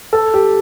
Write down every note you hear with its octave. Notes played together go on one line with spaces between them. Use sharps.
A4
G4